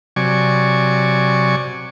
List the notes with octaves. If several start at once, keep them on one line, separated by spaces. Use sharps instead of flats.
C3 F#3 D5 G#5 C#6